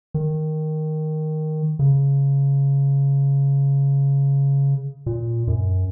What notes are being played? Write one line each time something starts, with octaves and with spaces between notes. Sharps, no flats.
D#3
C#3
A#2
F#2